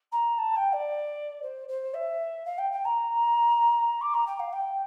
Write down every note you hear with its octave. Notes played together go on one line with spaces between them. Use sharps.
A#5
A5
G5
D5
C5
C5
E5
F5
G5
G5
A#5
D6
A#5
G5
F5
G5